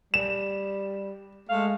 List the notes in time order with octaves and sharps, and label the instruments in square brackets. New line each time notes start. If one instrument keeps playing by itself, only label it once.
[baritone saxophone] G3 [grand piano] E7
[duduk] G#3 [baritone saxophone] A3 [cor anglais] F5